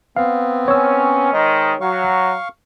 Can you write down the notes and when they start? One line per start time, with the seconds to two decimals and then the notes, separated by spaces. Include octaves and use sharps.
0.17 B3 C4 F5
0.68 C#4 C#5 E6
1.33 G#2 D#3 G#3 D#5
1.81 F#3 F5 C#6